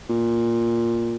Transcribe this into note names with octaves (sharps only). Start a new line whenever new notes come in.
A#2